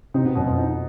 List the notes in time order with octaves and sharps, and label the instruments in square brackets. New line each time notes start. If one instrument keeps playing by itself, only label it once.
[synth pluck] C3 C4 [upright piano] D#4
[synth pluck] B2 B3
[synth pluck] F#2 F#3 [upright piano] B2
[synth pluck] F2 F3
[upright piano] D#4